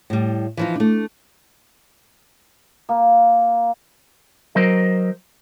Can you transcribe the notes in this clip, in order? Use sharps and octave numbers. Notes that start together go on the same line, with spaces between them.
A2 G3
E3 F3 D#4
A3 D4
A#3
F#3 A#4 C5 D#5